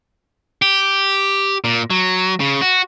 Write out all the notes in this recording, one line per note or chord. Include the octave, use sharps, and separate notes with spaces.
G4
A#2
F#3
C#3
F#4